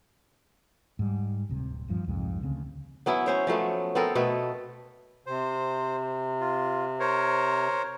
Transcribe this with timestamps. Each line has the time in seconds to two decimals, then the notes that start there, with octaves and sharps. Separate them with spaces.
0.99 G#2 G3
1.49 D1 C3
1.88 D1 G2 F3
2.08 C2 F2 G#2 G#3
2.42 D2 C#3 C4
3.06 F#3 B3 C#4 E4
3.26 C#4 C5 C#5
3.47 F3 F#3 A3 B3
3.95 B3 C4 A4 A#4
4.15 B2 A3 A4 B4
5.26 C3 C5
6.40 F4
7.00 A#4 C5 C#5